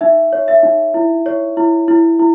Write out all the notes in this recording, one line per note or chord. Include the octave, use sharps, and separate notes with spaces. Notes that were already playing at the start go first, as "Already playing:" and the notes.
D#4 E5
C#5
E5
D#4
E4
C#5
E4
E4
E4